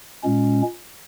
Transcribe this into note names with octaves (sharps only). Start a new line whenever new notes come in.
A#2 G#3 C#4